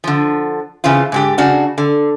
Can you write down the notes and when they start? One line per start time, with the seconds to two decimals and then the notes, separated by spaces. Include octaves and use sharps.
0.04 D3 F3
0.84 C#3 E3 C4 F4
1.12 G#2 D3 G4
1.38 C#3 D4 F#4
1.78 D3